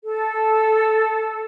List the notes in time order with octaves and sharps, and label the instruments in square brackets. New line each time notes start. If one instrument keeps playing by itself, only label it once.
[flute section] A4